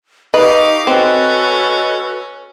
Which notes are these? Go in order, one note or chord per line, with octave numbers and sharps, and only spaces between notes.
D#4 G4 B4 D#5 F5 C#6 D6
C4 C#4 F#4 A4 B4